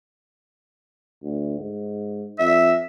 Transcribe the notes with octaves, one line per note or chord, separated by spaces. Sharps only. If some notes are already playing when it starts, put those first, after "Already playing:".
D2
G#2
F2 E5